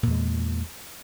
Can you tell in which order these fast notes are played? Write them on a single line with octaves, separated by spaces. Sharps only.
A#2 E2 G#3